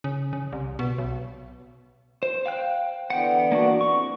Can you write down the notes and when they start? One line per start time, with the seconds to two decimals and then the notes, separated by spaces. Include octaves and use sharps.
0.04 C#3
0.33 C#3
0.52 C2
0.79 B2
0.98 B1
2.23 C5
2.46 F5 G5 F#6
3.10 D3 E3 B3 F#5 G5
3.52 A#3 D4 F#4
3.81 F2 C#6